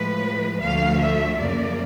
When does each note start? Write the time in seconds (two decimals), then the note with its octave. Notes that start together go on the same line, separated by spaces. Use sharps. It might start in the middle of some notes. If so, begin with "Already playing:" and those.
Already playing: A2 F3 G#3 B4
0.61 D2 D3 F3 A3 F5
0.99 E5
1.38 F#2 C#3 F3 A#3 D5